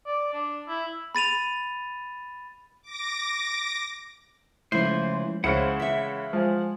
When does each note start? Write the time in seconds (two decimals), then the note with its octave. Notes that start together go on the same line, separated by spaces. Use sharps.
0.06 D5
0.33 D4
0.68 E4
1.15 B5 A6 D#7 F7
2.82 D6 A#6
4.72 C#3 E3 F3 G#3 A3 E4 C5
5.44 C#2 C#3 G#3 E4 C5 F#5 C#7 E7
5.80 E3 E5 B6
6.33 F3 G#3 G#5